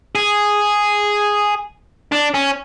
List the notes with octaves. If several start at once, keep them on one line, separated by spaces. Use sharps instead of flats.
G#4
D4
C#4